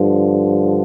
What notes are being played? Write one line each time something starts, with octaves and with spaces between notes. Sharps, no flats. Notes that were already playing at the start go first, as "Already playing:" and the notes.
Already playing: G2 D3 F3